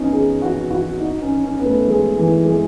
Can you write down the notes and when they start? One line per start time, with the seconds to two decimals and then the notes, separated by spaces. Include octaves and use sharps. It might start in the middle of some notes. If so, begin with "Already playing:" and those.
Already playing: B3 C#4 D#4
0.13 G#4
0.42 F#4
0.71 F#4
1.00 D#4
1.21 C#4
1.44 C#4
1.59 B3
1.65 A3
1.88 G#3
2.17 E3
2.46 G#3